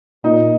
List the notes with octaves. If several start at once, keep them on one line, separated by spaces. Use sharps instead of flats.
A#2 D#4